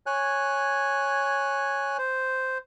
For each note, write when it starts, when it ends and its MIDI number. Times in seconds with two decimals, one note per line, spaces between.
0.06 1.97 73
0.06 1.97 80
0.06 1.97 90
1.98 2.58 72